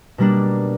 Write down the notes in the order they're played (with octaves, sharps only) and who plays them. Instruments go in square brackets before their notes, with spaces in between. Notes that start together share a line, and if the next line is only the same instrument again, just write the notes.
[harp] B2 G3 A#3 D4